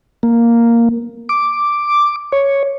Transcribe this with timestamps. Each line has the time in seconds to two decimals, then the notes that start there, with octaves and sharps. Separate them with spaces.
0.23 A#3
1.29 D6
2.32 C#5